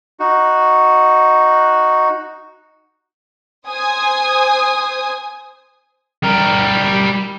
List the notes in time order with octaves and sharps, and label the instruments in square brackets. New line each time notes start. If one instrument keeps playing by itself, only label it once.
[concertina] D#4 F#4
[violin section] C5 G#5 D#6
[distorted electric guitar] G3 A#4